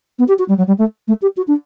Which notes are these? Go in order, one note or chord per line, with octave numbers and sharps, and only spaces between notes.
B3
G4
F#4
G3
F#3
G3
A3
A3
G4
F#4
D4